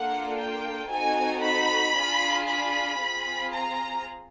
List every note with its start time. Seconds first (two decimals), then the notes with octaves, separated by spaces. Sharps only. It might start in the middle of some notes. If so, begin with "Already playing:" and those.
Already playing: A#3 D4 F4 A4 F#5
0.37 G5
0.89 C4 D#4 F#4 A4 G#5
1.42 B5
1.95 D4 F4 G#4
2.48 B5
3.00 C4 F4 G#4
3.54 A#5